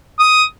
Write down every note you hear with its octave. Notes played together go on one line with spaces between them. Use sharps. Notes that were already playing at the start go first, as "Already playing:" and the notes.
D#6